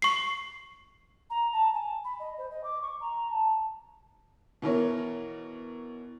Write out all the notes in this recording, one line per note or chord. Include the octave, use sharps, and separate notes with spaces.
C#6 C7
A#5
A5
G#5
B5
D#5
C5
D#5
D6
C#6
A#5
A5
B2 E3 A#4 C#5